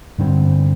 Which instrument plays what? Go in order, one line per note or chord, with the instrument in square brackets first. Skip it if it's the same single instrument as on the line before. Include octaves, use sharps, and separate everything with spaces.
[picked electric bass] G2 D3 G3 C4